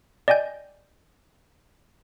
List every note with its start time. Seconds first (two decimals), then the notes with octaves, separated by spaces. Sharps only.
0.28 D5 D#5 G5 G#5 G6